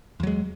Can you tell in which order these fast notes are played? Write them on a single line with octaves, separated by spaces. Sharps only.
E2 F#3 G#3